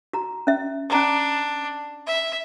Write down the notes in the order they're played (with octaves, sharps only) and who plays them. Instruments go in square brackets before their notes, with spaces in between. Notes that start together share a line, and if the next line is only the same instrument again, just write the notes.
[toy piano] F#4 A#5
C#4 E5
[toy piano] C#4 A#5 B5 [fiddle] D4
[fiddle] E5